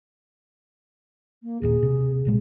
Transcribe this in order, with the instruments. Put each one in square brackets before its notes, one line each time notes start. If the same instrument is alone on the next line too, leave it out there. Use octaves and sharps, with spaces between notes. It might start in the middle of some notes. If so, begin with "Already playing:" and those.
[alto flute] A#3
[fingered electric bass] G#1 D#2 A#2 [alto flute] G#4
[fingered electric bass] C3
A#1 A#2 G#3